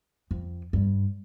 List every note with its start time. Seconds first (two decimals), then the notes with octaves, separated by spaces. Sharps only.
0.31 F2
0.73 G2